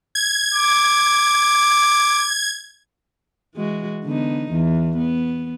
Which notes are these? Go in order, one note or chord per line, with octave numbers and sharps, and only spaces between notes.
G#6
D6
E3 G#3 F#4
D3 B3 D#4
E2 E3
B3